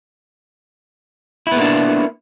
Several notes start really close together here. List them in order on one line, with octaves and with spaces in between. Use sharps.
E4 B3 A#3 D4